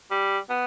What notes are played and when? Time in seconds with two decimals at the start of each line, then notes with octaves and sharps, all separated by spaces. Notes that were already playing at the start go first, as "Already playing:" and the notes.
0.11 G3
0.50 B3